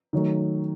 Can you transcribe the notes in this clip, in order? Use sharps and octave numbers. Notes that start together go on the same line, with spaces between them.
D#3 F#3 A3